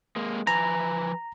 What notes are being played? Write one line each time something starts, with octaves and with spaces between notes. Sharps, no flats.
G#3 A#3
F3 B4 G#5 A#5